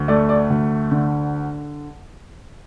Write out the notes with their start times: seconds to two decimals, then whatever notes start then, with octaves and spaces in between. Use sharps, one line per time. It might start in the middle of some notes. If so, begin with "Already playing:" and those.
Already playing: D2
0.08 A3 D5
0.29 D5
0.50 D2
0.91 D3